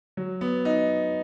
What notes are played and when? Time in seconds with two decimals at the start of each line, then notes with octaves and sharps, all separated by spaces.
0.17 F#3
0.41 B3
0.65 D#4